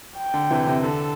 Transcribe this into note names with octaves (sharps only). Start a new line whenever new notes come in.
G5
D3
C3 E3
C3
D3 A4